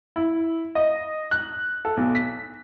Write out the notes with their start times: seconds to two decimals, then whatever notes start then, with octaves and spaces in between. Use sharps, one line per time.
0.16 E4
0.75 D#5
1.31 F#6
1.85 A4
1.97 B1
2.15 B6